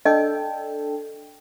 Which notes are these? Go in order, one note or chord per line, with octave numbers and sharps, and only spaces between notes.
D4 A4 D#5 G5